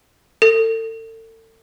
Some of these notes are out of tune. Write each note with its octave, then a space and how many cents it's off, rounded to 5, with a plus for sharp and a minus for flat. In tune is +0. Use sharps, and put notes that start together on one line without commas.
A4 +35